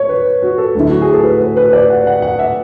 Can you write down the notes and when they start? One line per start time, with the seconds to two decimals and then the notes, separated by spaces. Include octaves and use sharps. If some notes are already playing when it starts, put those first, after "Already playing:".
Already playing: C#5
0.09 B4
0.42 F#4
0.58 A4
0.75 D2 D3 F#3 A3 E4
0.91 F#4
1.02 G#4
1.14 A4
1.24 B4
1.41 B4
1.57 B4
1.73 D5
1.90 F#5
2.07 F#5
2.22 F#5
2.39 E5